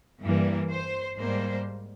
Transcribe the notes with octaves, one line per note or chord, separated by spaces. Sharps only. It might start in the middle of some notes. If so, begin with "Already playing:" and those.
G2 E3 G3 A#3
C5
G#2 G3 A#3 C5